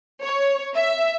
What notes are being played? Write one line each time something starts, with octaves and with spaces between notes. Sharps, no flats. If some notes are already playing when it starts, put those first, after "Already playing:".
C#5
E5